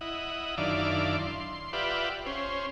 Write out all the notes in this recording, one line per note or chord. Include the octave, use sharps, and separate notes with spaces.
E4 D#5 F#5
F#2 D#3 D4 E4 D5 F5
C6
F4 G4 B4 D5 E5 F#5
C#4 C5